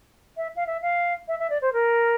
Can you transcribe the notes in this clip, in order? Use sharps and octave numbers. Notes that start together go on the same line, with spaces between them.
E5
F5
E5
F5
E5
E5
D5
C5
A#4